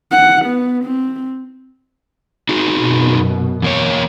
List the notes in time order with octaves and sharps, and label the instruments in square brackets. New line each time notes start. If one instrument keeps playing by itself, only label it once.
[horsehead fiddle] F#5
B3
C4
[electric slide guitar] D#4 F#4 G#4
[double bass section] F#2 B2
[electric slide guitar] E2 A#3 C#5